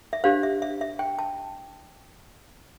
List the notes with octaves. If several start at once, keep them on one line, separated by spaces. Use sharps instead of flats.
E5
D4 G4 C5 F5
E5
E5
E5
G5
A5